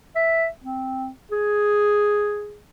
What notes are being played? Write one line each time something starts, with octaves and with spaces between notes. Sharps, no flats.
E5
C4
G#4